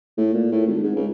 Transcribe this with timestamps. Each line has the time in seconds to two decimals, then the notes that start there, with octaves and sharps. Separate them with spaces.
0.18 A2
0.34 A#2
0.52 A2
0.67 G#1
0.83 G#2
0.96 C#2